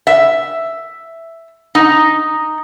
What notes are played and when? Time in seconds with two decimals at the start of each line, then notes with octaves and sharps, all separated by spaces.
0.07 E5
1.75 D#4